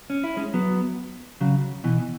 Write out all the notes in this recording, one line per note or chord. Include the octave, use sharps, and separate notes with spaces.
C#4
E4
G#3 C#4
F#3 B3
C#3 F#3
B2 E3